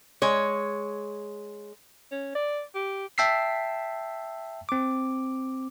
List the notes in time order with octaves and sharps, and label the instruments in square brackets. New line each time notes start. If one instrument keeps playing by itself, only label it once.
[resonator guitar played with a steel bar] G#3 C#5
[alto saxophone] C#4
D5
G4
[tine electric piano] E5 G5 A5 E6 B6 C7
C4 D6